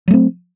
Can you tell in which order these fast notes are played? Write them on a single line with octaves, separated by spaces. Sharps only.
F#3 A3 C4